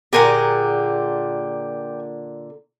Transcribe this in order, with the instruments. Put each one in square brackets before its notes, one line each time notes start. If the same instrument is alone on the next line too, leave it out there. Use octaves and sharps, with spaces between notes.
[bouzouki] A#2 D3 G#4 [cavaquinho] G4 A#4 G#5